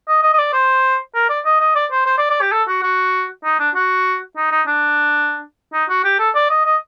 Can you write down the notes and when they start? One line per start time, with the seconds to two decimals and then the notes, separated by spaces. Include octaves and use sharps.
0.08 D#5
0.23 D#5
0.33 D#5
0.39 D5
0.53 C5
1.15 A#4
1.29 D5
1.45 D#5
1.60 D#5
1.75 D5
1.91 C5
2.06 C5
2.18 D5
2.30 D5
2.41 G4
2.52 A4
2.68 F#4
2.83 F#4
3.44 D#4
3.59 D4
3.75 F#4
4.37 D#4
4.51 D#4
4.67 D4
5.73 D#4
5.90 F#4
6.04 G4
6.19 A4
6.35 D5
6.50 D#5
6.65 D#5